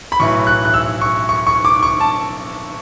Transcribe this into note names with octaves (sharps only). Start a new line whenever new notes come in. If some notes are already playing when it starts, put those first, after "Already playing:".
B5
B1 A2 E3 C#6
F#6
F#6
E6
C#6
C#6
C#6
D6
C#6
A5